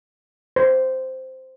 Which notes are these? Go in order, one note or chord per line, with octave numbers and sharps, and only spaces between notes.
C5